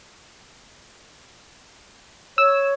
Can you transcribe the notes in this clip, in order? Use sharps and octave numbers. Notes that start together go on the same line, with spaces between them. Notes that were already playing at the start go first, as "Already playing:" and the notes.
C#5 E6